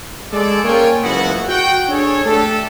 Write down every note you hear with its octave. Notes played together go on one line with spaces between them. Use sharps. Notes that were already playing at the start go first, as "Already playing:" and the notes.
G#3 A4 D5
A#3 C#4 F4 C#5 G5 G#5
F#1 C#2 B3 E4 F#4 F#5
F#4 F#5 G5
D4 G#4 A4 C#5
A3 D4 G4 A4